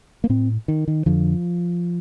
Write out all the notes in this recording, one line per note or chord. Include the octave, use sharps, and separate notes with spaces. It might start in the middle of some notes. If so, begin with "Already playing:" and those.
A#3
A2 C4
D#3
D#3
F2 D3 F3